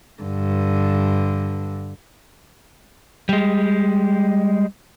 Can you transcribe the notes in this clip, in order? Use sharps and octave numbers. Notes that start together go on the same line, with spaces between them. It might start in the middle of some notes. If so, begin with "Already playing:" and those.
G2 D3
G3 G#3